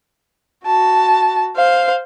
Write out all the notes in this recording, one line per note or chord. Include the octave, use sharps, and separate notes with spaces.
F#4 A5
C5 F5